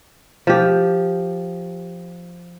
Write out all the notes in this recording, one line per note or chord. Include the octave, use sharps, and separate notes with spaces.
F3 G4